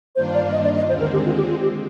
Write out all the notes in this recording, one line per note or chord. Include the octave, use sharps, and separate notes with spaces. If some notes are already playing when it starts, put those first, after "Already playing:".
G2 D#3 A#3 D4 F4 C5
D5
D#5
D5
D#5
D#2 D3 G#3 C4 C5
A#4
G4
F4
G4
F4
G4